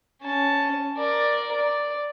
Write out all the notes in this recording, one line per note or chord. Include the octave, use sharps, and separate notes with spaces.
C#4 A5
A#4 D5
D5